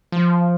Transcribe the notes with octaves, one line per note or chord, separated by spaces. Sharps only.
F3